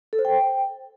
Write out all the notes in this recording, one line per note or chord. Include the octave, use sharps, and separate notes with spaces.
A4
C5
G5